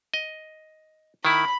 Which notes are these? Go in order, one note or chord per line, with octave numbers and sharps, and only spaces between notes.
D#5
D#3 E4 B5